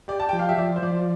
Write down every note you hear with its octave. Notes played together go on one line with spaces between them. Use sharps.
G4 D5
A5
F3 G5
F5
E5
F3 D5
C5
F3 D5